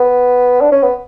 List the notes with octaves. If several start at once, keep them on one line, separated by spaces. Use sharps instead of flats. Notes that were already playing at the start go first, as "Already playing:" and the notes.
Already playing: B3
D4
C#4
B3